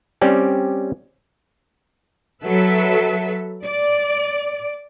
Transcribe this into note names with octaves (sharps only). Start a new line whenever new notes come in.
G3 C4 C#4 G4 D5
F#3 A4 B4 E5
D5